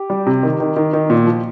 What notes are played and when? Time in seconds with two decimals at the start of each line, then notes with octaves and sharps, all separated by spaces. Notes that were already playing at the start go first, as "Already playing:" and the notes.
Already playing: G4
0.10 G3
0.26 C3
0.43 D#3
0.60 D#3
0.76 D#3
0.93 D#3
1.10 A#2
1.27 F3